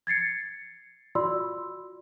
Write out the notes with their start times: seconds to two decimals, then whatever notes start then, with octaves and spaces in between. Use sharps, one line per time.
0.07 G#6 A6 C7 C#7
1.15 F4 F#4 D5 B5 C6 E6